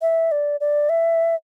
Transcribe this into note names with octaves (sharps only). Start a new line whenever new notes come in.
E5
D5
D5
E5